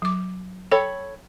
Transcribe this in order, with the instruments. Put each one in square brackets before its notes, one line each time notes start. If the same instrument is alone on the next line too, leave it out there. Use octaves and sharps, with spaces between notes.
[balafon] F#3 D6
[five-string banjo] A4 C#5 B5 [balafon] G5